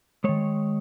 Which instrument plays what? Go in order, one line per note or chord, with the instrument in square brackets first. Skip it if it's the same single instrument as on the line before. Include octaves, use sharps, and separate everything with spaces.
[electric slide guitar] D#3 G#3 C#5